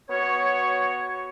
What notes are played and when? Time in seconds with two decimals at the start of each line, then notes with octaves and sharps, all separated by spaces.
0.09 B3 F#4 C#5